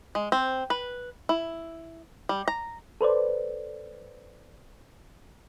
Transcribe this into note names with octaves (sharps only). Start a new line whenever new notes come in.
G#3
C4
B4
E4
G3
A#5
A4 B4 C5 D5